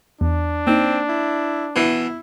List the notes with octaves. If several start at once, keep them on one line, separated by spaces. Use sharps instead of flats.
E2 D4
A#3 C4 D#4
E4
B2 E3 E4